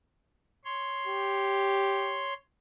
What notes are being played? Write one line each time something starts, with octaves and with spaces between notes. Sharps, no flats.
C#5 C6
G4